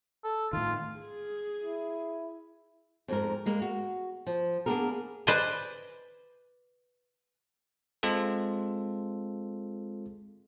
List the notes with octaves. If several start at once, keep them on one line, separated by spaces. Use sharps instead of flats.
A4
A2 D#3 F4
G#4
E4
F2 G#2 A#4
G3 G#3 A#3
F#4
F3
A#3 B3 D4 F#4 G#4 A#4
B4 C5 D5 D#5 G#5
G#3 C4 F4 A4